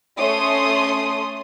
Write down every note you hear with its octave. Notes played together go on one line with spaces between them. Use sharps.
A3 C#4 C#5 C6 D#6